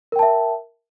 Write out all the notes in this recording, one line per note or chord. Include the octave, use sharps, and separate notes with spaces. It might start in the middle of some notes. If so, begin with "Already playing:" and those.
A#4 E5 G5 A5